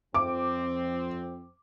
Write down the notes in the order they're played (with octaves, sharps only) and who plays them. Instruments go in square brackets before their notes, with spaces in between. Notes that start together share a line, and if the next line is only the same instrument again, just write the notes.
[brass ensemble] F2 C4 [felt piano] D6